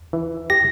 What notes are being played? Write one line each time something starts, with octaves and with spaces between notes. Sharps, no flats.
E3
G4 A#6